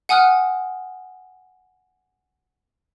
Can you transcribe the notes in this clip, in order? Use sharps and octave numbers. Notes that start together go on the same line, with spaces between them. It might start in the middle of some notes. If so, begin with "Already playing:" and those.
F#5 G#5 D#6 F6 F#6